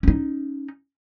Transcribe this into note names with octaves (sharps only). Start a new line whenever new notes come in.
C#4 D#4